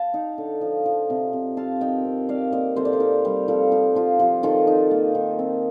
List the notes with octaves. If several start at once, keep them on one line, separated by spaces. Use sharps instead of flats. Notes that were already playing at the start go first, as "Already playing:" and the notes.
Already playing: F5 A5
D#4
D3
F3
F3
C3
C3
C4 F5 A5
D#3 D#5 G5
C4
D#3 D5 F5
A#3 C5 D#5
C3 A4 C5
D5
C5
D#4 G4 A#4
G3
F3 F4 A4
F3 G4
F3 F4
F3 G4
D#3 F4 A4
D#4
A#3
D#3
C4